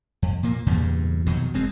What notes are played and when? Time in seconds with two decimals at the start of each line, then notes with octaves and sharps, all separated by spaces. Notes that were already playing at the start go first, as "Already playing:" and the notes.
0.22 F2
0.43 A#2 A#3
0.66 E2 G2 A#2 C#3
1.26 F2 B2 D#3 F#3
1.54 F#1 F#2 G#3 C4